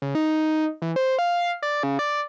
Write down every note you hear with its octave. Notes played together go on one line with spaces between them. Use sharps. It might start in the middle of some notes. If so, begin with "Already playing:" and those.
C#3
D#4
E3
C5
F5
D5
C#3
D5